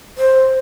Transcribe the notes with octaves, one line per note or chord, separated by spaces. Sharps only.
C5